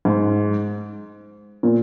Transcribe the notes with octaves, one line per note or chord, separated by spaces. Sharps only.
G#2
A#2